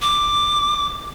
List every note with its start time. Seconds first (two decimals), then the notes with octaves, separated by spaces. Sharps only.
0.02 D6